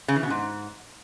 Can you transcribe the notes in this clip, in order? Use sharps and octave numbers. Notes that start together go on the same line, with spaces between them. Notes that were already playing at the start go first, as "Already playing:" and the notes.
C#3
E3
B2
G#2